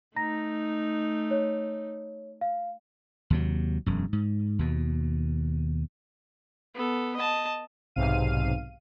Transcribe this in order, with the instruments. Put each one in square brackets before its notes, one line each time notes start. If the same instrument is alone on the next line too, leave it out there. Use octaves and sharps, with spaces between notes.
[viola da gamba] A3 D#4 [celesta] A#5 A#6
[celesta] C#5
F5
[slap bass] D#2 C3 F#3
E1 F#2
G#2
D#2 B2
[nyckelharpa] B3 A4
D#5 A5
[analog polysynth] B1 G#2 C3 F5 D#7